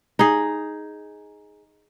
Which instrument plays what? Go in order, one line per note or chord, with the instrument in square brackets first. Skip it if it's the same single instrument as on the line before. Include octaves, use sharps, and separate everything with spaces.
[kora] D#4 G#4